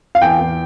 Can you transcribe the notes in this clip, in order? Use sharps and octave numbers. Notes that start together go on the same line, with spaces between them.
F5
E2 G5
E2